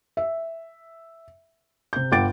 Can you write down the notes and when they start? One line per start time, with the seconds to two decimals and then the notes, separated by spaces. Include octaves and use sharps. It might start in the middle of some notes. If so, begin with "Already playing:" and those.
0.17 E5
1.93 C3 G6
2.12 G1 F#5 G5 D6 A6 D7